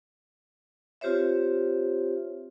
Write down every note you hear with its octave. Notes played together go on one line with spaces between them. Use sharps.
C4 F4 G4 C5 C#5 E5